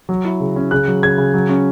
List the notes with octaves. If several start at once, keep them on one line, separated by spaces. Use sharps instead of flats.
F#3
E4
C#3
C#4
C#3 F#6
F#3
C#3 G#6
C#3
F#3
C#4